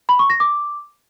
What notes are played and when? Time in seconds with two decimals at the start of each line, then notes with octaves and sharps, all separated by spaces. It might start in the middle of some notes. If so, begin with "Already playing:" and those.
0.09 B5
0.19 C#6
0.30 A#6
0.40 D6